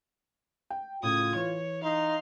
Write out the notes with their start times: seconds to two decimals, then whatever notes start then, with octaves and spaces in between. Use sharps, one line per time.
0.70 G5
1.03 A2 C#3 F4 D#6 G#6
1.36 E3 C#5
1.83 D#4 F5 C6